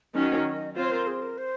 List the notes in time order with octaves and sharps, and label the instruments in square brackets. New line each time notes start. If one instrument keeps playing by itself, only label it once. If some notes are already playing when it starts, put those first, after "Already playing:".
[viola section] D#3 F#3 C#4 [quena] D#5
[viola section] C4 F4 C5 [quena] C#5
[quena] A#4
G#4
A#4
C5